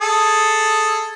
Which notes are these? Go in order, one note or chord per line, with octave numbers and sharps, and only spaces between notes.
G#4 A4